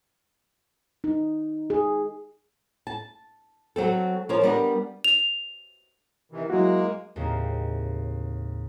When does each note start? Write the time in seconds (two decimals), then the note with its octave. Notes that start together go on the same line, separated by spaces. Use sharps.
1.04 D#4
1.70 G#4
2.87 A5
3.76 F#3 C4 A4
4.29 F3 A#4 C#5
4.43 G3 B3 D4 A#4
5.04 F7
6.32 C3 D#3 E3
6.50 F#3 G#3 A#3 E4 F#4
7.16 D#2 A2 C#3 C4